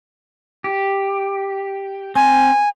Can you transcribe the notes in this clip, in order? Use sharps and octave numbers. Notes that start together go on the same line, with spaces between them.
G4
C4 G#5